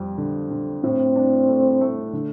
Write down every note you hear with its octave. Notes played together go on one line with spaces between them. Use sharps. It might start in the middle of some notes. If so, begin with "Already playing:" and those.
Already playing: F2 G3
D3
D3
A2 C4
D4
A3
A3
D3